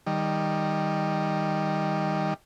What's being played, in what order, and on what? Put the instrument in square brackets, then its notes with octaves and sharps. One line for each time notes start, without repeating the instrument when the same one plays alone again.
[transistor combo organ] D#3 G3